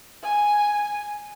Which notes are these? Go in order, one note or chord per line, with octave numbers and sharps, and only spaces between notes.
G#5